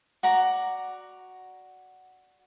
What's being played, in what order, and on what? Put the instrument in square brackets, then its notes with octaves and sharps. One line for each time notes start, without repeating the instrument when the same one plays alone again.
[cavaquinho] F#4 D5 A#5